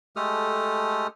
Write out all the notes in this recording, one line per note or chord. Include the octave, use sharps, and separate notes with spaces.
G#3 A3 G4 A4 D#6 F6